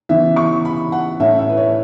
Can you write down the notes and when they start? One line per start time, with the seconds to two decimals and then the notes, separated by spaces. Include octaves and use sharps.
0.09 C#3 E3 B3 E5
0.36 C#6
0.65 B5
0.92 F#5
1.20 A2 A3 C#4 E5
1.39 E5
1.49 B4
1.57 C#5